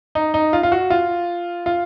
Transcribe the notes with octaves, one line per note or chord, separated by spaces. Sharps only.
D#4
D#4
F4
F4
F#4
F4
F4